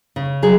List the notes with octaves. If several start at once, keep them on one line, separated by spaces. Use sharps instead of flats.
C#3
F#3 G#4